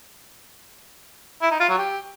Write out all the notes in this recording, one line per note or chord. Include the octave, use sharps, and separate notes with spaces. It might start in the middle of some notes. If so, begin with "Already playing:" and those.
E4
D#4
F4
F#3
G4